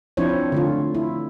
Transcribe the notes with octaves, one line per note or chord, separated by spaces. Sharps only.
F3 C4 D4 E4 C5 C#5
D3 A3 F4
E4